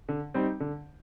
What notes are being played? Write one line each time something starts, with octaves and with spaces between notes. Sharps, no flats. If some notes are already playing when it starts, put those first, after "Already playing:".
D3
G3 C4 D#4
D3